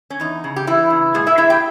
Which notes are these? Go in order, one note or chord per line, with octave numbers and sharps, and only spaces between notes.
C#4
E2 D#4
C#3
G4
E3 G3 E4
C#3
A#2 G#3 G#4
E4 E5
A#2 E4 E5
G4 G5